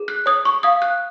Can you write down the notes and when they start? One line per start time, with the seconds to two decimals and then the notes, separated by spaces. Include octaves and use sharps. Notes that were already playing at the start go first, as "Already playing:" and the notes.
Already playing: G#4
0.08 F#6
0.26 C#5 D#6
0.45 C#6
0.63 F5 D#6
0.82 F#6